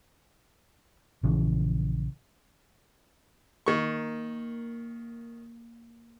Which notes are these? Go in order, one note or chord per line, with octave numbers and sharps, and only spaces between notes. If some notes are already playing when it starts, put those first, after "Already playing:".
A#1 C#3 E3
D#3 A#3 C#6